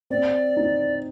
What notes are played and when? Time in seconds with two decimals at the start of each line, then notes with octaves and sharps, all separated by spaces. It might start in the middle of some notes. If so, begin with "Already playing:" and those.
0.10 C4 D5
0.57 D#4